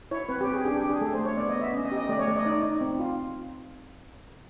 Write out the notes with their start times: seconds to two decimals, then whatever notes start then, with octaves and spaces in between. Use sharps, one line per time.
0.11 E4 C#5
0.29 C4 B4
0.41 G4
0.47 C4
0.53 G#4
0.65 D4 G4
0.78 G4
0.83 D4
0.90 G#4
1.01 A3 A4
1.14 C5
1.19 A3
1.25 C#5
1.37 B3 D5
1.49 D#5
1.56 B3
1.61 E5
1.73 C#4 D#5
1.85 D#5
1.92 G4
1.97 D#5
2.09 A3 D5
2.19 C#5
2.27 A3 D5
2.36 D#5
2.45 D#4 D5
2.63 D#4
2.81 C4
2.99 F4